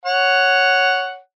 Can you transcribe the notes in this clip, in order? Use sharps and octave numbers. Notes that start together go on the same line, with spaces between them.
C#5 F#5